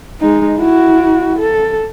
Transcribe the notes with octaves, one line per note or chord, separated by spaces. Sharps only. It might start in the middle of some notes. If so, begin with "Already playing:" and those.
G#3 D#4
E4 F#4
A4